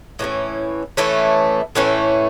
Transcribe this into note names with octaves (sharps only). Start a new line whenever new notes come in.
A2 E3 A3 C#4
A2 E3 A3 C#4
A2 E3 A3 C#4